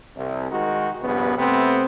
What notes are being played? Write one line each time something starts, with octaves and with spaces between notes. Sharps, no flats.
C2
D#3 G#3 D#4 F#4
A#1 G2 C#3 B3
C3 A3 B3 C4